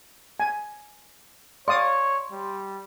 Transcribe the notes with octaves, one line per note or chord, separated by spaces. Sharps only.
G#5
C#5 D5 F5 C6 D#6
G3